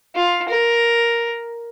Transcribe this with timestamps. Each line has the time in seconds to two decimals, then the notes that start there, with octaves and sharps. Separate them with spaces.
0.15 F4
0.48 A#4